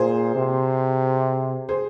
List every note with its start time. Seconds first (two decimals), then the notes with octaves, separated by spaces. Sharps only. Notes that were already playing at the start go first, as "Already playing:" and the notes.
Already playing: A#2 G#4 C5
0.35 C3
1.69 G#4 C5